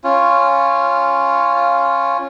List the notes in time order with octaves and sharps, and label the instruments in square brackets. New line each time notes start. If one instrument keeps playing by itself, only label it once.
[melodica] C#4 F4